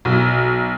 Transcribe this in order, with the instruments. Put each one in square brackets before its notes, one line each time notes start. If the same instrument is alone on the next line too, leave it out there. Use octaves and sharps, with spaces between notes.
[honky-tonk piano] B1